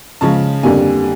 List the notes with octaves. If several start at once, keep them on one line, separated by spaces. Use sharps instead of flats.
C#3 F3 G#3 C#4 A5
F2 D3 G3 A#3 G#5